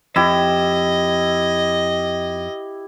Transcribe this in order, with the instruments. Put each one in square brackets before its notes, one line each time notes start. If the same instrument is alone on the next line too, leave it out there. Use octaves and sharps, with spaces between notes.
[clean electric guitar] F2 [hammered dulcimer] E4 G4 [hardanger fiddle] D#5